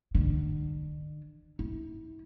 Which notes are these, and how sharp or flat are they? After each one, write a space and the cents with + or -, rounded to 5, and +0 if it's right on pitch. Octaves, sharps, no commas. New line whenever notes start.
D3 +40
E4 -45